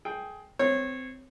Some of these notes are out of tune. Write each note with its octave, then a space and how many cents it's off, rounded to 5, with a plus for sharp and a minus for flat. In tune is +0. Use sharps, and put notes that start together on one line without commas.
G#4 +20 G5 +0
C4 -20 C#5 -20